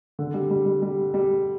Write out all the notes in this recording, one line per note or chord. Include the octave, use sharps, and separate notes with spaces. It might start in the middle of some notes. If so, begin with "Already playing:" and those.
D3
G3
G3
G3
G3
G3